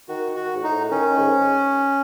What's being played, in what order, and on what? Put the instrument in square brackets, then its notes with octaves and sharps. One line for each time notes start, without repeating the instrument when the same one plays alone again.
[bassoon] D#3 [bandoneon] F#4
[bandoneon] F#4
[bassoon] G#2
[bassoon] A2 [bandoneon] D#4
[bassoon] D#3 [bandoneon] C#4
[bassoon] G#2